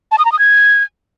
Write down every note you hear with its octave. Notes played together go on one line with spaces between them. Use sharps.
A5
D#6
A#5
D#6
G#6